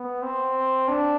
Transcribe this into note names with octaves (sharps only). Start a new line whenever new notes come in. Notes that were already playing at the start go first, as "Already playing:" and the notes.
Already playing: B3
C4
D4